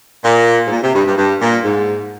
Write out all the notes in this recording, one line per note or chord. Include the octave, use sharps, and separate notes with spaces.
A#2
G#2
A#2
C3
G2
G2
G2
A#2
G#2